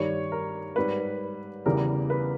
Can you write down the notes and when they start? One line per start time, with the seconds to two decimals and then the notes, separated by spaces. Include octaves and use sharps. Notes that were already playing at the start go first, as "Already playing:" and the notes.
Already playing: G2 D#3 G3 C#5
0.32 A#4
0.76 G#2 G3 B4
1.66 E2 C#3 E3 G3 A#4
2.10 B4